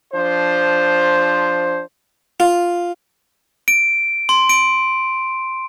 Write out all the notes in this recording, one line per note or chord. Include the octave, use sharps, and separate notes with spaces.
F3 D4 C5
F4
D7
C6
D7